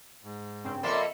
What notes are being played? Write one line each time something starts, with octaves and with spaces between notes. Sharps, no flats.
G#2
G2 C#3 C4
F2 A#3 D5 E5 C6 C#7